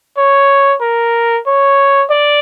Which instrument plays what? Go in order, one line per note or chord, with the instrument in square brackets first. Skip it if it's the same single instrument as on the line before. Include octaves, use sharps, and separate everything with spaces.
[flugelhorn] C#5
A#4
C#5
D5